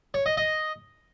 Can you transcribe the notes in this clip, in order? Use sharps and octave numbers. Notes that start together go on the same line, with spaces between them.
C#5
D#5
D#5